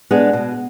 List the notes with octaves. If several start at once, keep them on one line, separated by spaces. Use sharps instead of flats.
G#3 B3 D4 G#4
B2